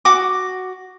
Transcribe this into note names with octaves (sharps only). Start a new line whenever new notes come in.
F#4 D6